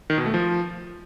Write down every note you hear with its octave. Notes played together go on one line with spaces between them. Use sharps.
D#3
B2
A3
F3